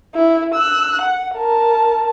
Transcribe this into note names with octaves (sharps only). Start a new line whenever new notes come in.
E4
E6 F#6
F#5
A#4 A5